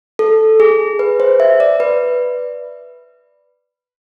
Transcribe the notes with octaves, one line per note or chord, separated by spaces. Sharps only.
A4
G#4
B4
C5
E5
D5
B4